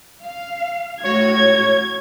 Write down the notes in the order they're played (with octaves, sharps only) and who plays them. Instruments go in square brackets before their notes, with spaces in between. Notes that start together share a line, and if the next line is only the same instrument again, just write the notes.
[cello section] F5
[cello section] A2 F#4 [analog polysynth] C#5 [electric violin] G#6